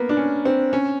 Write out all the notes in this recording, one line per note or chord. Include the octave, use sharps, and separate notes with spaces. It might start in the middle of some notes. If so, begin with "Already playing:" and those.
Already playing: A#3 B3
D4
C#4
C4
C#4